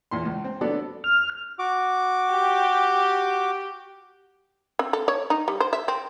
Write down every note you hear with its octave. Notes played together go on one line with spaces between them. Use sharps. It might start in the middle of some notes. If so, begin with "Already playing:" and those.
E2 A#2 C6
C#2
C4
F#3 B3 D4 A4 D5
F6
F#4 D6
G4
C4
A4
C#5
D#4
G3
C5
E5
C4